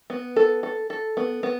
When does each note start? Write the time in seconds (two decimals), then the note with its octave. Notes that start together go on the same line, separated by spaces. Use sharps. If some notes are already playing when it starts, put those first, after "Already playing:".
0.10 B3
0.36 A4
0.63 A4
0.90 A4
1.17 B3
1.43 B3